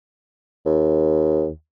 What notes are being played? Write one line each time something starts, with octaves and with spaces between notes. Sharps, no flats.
D#2